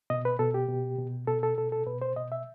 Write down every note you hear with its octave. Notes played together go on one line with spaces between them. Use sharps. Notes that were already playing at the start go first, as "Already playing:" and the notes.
B2 D#5
B4
B2 A4
G4
B2
B2
B2 A4
A4
B2 A4
A4
B2 B4
C5
B2 D#5
E5